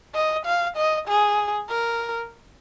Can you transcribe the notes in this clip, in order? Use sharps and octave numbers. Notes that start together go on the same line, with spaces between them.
D#5
F5
D#5
G#4
A#4